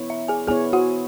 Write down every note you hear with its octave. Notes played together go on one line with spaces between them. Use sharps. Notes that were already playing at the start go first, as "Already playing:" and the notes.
Already playing: B3 E4 C#5
E5
G#4 G#5
B3 E4 G#4 C#5 G#5
F#4 F#5